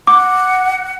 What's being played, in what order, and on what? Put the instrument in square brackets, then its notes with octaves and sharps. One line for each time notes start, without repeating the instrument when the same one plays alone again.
[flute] F#5 [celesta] D6